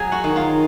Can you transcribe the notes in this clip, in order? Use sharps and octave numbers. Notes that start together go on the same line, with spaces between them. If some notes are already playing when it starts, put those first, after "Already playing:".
Already playing: F#3 G#4 G#5
F#4 F#5
D#3
F4 F5